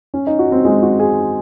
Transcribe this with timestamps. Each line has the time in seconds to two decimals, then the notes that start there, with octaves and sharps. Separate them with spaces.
0.14 C#4
0.27 D#4
0.39 F#4
0.52 C4
0.65 G#3
0.82 F#4
0.99 G#4